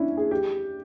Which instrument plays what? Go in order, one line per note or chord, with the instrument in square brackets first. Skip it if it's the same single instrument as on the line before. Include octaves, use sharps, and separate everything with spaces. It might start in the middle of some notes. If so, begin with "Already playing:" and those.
Already playing: [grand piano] C#4 D4 E4
G#4
G4